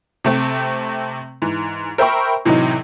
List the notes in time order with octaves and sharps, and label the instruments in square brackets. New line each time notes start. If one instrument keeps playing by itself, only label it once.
[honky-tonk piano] C3 A3 C4
G#2 E3
A#4 C5 E5 G5 B5 C#6
A2 C3 E3 F#3 D#4